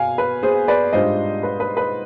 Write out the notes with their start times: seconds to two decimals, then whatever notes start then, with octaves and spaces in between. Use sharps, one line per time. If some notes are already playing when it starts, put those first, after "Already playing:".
Already playing: B2 F5 G#5
0.18 B4
0.43 G#4 C5
0.68 B4 D5
0.93 G#2 G3 D4 F4 C5 D#5
1.43 B4
1.60 B4
1.77 B4